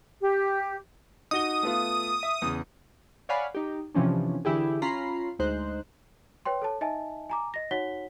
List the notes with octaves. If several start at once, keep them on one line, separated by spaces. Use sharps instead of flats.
G4
D#4 F#4 D#6 G7
A3 B3 F4
E5
E2 C#3
C#5 D5 F5 F#5 G#5 B5
D#4 G4
C3 E3 F3 C#4 D4
D3 E3 E4 G4 G#4
C#4 F4 A#5 B5 C7
D2 G#3 D#4 C5 F#6
B4 C#5 G5 C6
A4 C#5 A5
D#4 D#5 E5 G#5 A5
G#5 A#5 D6
D#5 A#6
D#4 F#4 C#5 F#5 B6 G7